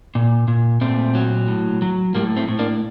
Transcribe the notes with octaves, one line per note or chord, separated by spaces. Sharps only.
A#2
A#2
A#2 A3 C4
F#3
A2
F#3
A2 G3 A#3
A3 C4
A2
A#3 D4